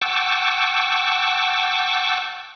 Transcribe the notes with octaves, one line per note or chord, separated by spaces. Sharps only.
F#5 G5 A5 C#6 D6 E6